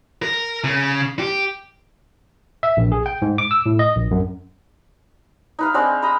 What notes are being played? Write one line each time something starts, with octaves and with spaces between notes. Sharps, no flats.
A#4
C#3
G4
E5
A#1
G#4
G5
G#2
D6
E6
A2
D#5
A#1
F#2
D#4 B4 F5
G#3 C4 D4 C5
D#5 A#5 B5